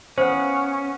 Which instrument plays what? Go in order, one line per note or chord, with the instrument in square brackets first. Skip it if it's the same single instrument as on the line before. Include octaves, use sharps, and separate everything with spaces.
[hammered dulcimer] B3 F5 F#5 [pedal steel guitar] C#4 [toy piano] C5